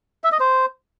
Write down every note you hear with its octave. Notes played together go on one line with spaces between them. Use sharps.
E5
D#5
C5